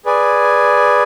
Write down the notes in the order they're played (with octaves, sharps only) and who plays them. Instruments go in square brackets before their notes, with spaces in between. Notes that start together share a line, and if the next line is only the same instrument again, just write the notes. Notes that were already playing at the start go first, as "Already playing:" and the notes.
[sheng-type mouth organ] G#4 B4 D5 G#5